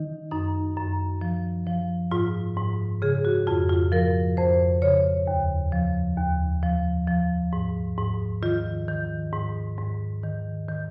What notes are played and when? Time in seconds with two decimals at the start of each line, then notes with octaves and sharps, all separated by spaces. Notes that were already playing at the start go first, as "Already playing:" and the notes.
Already playing: D#3 D#4
0.31 F#2 D#4
0.77 F#2
1.21 F3
1.66 F3
2.12 G#2 F4
2.57 G#2
3.02 C#3 G#4
3.25 F#4
3.47 F2 F4
3.69 F4
3.92 F3 A#4
4.37 F2 C5
4.82 C#3 C#5
5.27 D#2
5.72 F3
6.17 D#2
6.63 F3
7.08 F3
7.53 G#2
7.98 G#2
8.43 D#3 F4
8.88 D#3
9.33 G#2
9.78 G#2
10.23 D#3
10.69 D#3